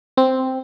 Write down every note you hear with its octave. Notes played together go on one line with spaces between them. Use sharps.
C4